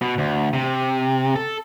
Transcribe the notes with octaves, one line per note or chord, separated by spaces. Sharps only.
B2
D2
C3
A4